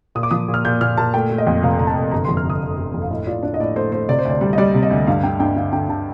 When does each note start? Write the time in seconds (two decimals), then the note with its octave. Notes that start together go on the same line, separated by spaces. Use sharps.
0.15 A#2 D#6
0.23 D6
0.31 F3 D#6
0.48 A#2
0.54 F6
0.65 A#2 G6
0.81 A#2 F6
0.97 A#2 A5
1.14 A3 G5
1.30 A3
1.38 D#5
1.47 F2
1.63 F1 F5
1.79 F1 A#5
1.87 A5
1.96 F1
2.12 G1 A#5
2.25 F2 C6
2.37 F6
2.45 G1 D#6
2.61 G1
2.78 G1
2.94 F2
3.02 F5
3.10 A2 D#5
3.27 F4 D5
3.43 D4 D5
3.54 D#5
3.60 A2 D5
3.76 A3 C5
3.92 A3 C5
4.09 C3 D5
4.19 C5
4.25 D2 D5
4.41 G3
4.53 D#5
4.58 G3 D5
4.74 C3
4.83 D#5
4.91 D2
5.07 G2 F5
5.23 D3 G5
5.40 G2 G5
5.56 D3 F5
5.73 D3 G5
5.89 D3 A5